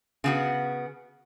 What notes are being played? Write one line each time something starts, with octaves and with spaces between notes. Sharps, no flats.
C#3 B3 F#4